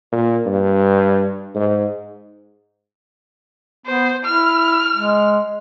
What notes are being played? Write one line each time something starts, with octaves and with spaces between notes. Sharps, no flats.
A#2
G2
G#2
B3 C5
E4 F6
G#3